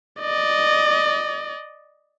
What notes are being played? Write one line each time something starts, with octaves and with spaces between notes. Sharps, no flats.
D5 D#5